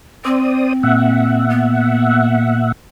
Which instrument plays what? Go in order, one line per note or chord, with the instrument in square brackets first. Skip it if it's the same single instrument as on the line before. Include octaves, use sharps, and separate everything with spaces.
[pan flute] C4 [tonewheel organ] C5 D5 D#6
[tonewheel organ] A#2 E5 F#5
[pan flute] B3